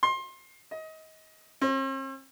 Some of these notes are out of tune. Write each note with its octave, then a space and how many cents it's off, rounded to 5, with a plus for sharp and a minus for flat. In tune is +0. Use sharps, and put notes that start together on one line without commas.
C6 +25
D#5 +25
C4 +45